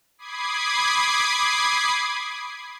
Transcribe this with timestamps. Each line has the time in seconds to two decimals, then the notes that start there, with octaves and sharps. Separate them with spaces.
0.18 B5 D6 D#6 G#6 C7